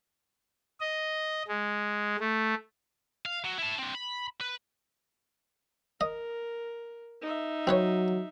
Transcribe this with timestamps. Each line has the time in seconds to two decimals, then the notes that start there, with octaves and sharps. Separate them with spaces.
0.81 D#5
1.48 G#3
2.20 A3
3.26 F5
3.44 F#3
3.58 E4 A5
3.79 C4 D4
3.95 B5
4.41 B4
6.01 A#4 D#5
7.22 D#4 E5
7.67 F#3 C4 B4 C#5